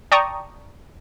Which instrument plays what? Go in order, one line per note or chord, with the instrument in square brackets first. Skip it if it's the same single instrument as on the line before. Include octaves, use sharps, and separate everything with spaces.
[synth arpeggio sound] D5 G5 A5 A#5 C#6 D#6